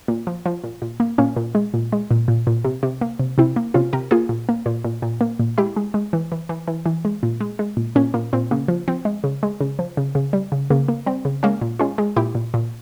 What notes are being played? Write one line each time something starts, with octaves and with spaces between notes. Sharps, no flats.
A#2
F3
F3
A#2
A#2
A#3
A#2 A#3 C#4
A#2
G#3
A#2
G#3
A#2
A#2
A#2
C3
C3
A#3
C3
C3 C4 E4
A#3
C3 C#4 F4
C3 G4 A#4
A#3 F4 G#4
A#2
A#3
A#2
A#2
A#2
A#3
A#2
G#3 E4 G4
G#3
G#3
E3
E3
E3
E3
E3
G#3
A#2
G#3
G#3
A#2
A#2 A#3 C#4
A#2 A#3
A#2 C4
C#3 A#3
F3
F3 C4
G#3
C#3
G#3
C#3
F3
C#3
C#3
G3
C#3
C#3 A#3
A#3
G3 C4
C#3
G#3 A#3 C#4
A#2
G#3 C#4 F4
G#3
A#2 E4 G4
A#2
A#2